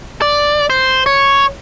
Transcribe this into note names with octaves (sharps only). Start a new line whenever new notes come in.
D5
C5
C#5